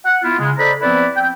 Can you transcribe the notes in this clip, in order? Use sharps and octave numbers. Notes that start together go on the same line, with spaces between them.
F#5
B3 E4 F4
C#3 G#3
A4 C5 D5 D#5 A#5 B5
F3 B3 C4 E4 B4 D5
C4 G5